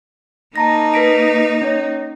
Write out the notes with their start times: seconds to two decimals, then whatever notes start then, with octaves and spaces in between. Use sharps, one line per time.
0.56 A#3 D#4 A5 A#5 A#6
0.94 B4 B6 D7
1.62 C#4 C#5